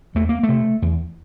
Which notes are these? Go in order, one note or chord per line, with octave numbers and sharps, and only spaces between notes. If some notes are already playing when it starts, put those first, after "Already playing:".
E2 A3
A#3
A3
C3
E2